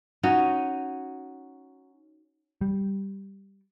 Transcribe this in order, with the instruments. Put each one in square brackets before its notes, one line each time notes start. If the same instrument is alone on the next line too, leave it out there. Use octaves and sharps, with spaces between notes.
[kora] C#4 D#4 F#4
[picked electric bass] G3